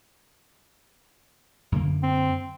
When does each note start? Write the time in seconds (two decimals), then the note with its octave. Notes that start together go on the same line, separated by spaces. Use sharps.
1.72 F#2 D3 A#3
2.03 C4